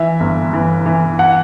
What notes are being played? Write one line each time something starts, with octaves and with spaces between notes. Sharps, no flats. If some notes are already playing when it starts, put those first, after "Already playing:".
Already playing: E3 E5
G1
E3
E3
F#5